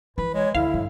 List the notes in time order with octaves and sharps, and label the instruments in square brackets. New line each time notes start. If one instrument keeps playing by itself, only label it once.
[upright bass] E3 [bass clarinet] B4
[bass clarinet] G#3 [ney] C#5
[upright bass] D2 [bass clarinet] D3 [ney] E4 [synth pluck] F5
[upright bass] G2